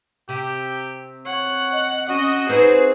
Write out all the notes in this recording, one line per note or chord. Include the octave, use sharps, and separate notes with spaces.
C3 G4
C#5 F#5
D#5
C#4 F#4 D#5
C4 D#4 G#4 B4 C5